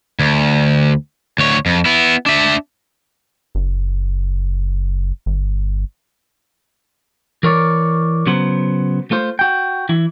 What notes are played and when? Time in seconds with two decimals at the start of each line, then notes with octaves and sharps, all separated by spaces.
0.19 D2
1.38 D2 C#5
1.66 F2
1.85 B3 E4
2.26 D4 E5
3.55 F#1
5.26 G1
7.43 E3 A#4 C#5 D5
8.26 C#3 F#3 B3 C5
9.11 A3 F4 C5
9.39 F#4 G5
9.89 E3 E4